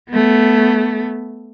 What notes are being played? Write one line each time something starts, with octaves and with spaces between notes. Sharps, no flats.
A3 B3